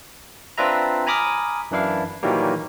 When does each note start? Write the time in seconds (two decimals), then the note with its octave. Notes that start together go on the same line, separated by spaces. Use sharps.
0.58 C4 D4 F4 B4 E5 A#5
1.07 G#5 A#5 B5 D6 D#6 F6
1.71 F#2 E3 D4 E4 F5
2.23 A#2 D#3 E3 F#3 G3 A#3